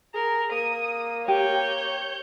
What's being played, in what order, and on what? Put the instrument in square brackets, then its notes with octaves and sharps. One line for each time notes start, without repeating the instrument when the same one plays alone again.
[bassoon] G#4 [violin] A#4
[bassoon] A#3 [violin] D#6
[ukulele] G4 [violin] C#5 G6